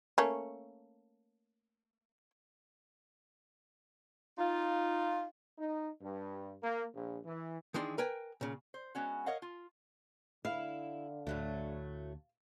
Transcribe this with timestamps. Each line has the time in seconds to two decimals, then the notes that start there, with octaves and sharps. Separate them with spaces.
0.18 A3 A#3 C#4
4.39 D#4 F4
5.59 D#4
6.01 G2
6.63 A#3
6.94 A#1
7.25 E3
7.74 D#3 E3 G#3 D4 C6
7.98 A#4 B4 G5 G#5
8.41 A#2 C#3
8.74 C5
8.95 G#3 B3 C#4 F#4
9.26 A#4 C#5 D#5 F5 F#5
9.42 F4
10.45 D3 E4 F5
11.27 D2 A2 F#3 A3